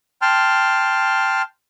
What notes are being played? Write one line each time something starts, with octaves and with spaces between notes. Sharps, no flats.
G5 A5 C6 F6